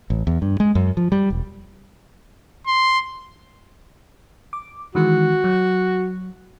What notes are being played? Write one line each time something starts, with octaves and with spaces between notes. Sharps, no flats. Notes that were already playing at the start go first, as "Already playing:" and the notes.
A1
E2
G2
G#3
F#2
F3
G3
E1
C6
D6
D#3 E3 G#3 F#4
F#3